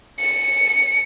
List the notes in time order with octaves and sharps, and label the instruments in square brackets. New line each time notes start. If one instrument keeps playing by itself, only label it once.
[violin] C#7